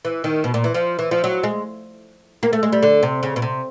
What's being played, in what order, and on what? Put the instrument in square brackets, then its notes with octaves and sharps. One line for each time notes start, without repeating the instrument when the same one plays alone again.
[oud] E3
D#3
B2
A#2
E3
F3
E3
F3
F#3
G#3
A#3
A3
G#3
G3
D3
C3
C#3
B2
C3